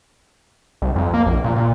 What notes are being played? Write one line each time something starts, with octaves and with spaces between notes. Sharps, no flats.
C2
F2
A#3
A#1
A#2
A#2